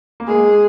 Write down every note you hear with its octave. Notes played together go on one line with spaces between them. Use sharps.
A#3
G#3 G#4